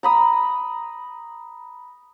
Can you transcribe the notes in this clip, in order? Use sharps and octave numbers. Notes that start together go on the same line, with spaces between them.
A#5 B5 D#6